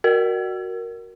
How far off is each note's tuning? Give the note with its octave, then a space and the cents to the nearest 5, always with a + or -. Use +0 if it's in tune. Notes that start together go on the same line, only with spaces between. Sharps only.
F#4 +0 A#4 +0